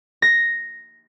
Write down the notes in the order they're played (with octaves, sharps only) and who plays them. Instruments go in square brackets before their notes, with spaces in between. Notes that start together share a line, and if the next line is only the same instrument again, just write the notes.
[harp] A#6